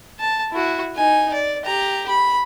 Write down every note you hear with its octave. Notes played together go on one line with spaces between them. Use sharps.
A5
E4 F#4
D#4 G#5
D5
G4 A#5
B5